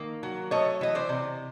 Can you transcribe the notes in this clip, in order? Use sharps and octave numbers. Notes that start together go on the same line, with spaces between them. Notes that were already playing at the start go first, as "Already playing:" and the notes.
Already playing: D#3 A#3
F#3
A3 C#5 D#5
E3 D#5
C5 D5
C3